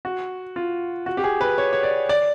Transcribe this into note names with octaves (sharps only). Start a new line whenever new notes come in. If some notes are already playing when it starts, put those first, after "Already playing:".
F#4
F4
F#4
G4
G#4
B4
C#5
C#5
D5
D5